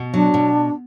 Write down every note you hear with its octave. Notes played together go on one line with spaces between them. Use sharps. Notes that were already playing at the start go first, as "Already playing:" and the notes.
Already playing: B2
F#3 D4
B2